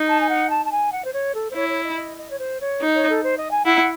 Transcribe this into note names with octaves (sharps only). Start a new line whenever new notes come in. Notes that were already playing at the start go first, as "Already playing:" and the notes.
Already playing: D#4
A5
G#5
F#5
A5
A5
G#5
F#5
C5
C#5
A4
C5
E4 C#5
C#5
D#5
D#5
D#5
C#5
C5
C#5
D#4
C#5
A4
C5
D#5
G#5
E4 F#5